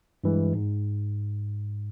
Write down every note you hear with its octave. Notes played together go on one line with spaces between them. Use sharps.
G2 E3 G#3
G#2